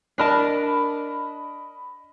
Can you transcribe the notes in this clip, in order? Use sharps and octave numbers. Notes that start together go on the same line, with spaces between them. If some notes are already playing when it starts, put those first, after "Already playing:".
D4 A#4 D#5 A5 B5